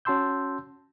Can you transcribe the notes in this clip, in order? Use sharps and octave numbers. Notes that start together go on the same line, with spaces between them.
C#4 F#4 A5 C6 E6 G6